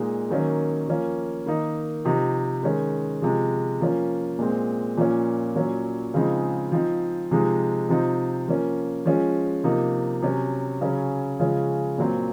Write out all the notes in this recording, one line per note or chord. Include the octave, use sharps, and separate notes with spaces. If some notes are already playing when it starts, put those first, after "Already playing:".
Already playing: A#2 G#3 D#4
D#3 F#3 A#3 C#4
F3 A#3 C#4
D#3 A#3 D#4
C3 F3 C4 D#4
D#3 G#3 C#4
C3 F3 G#3
F3 A#3 C#4
A#2 G#3 C4
A#2 F3 A#3 C#4
A#2 F#3 C#4
C#3 F3 G#3 C4 D#4
F3 C4 D#4
C3 F3 G#3 D#4
C3 F3 C4 D#4
F3 A#3 C#4
F3 G#3 C#4
C3 F3 A#3 D#4
C3 F#3 C#4
C#3 F#3 C#4
C#3 F3 G#3 C#4
A#2 F#3 C4